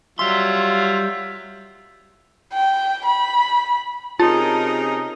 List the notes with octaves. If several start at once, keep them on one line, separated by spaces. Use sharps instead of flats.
F#3 G3 F4 E5 C6
G5
B5
C3 C#4 D#4 F4 G#4 A#4 A5